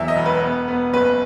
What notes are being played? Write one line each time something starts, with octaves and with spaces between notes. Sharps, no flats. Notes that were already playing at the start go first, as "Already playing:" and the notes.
Already playing: E2 F#3 E5
D#5
E1
B4
B3
B3
F#1 B4